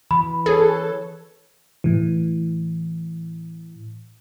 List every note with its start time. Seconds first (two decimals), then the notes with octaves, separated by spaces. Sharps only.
0.11 E3 B5
0.46 G#4 A4 B4 C#5
1.84 A2 E3